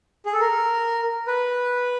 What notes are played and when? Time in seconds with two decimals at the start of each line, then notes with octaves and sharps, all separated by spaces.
0.26 G#4
0.33 A4
0.41 A#4
1.27 B4